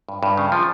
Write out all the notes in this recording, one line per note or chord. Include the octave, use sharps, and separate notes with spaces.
G2
G2
C#3
F3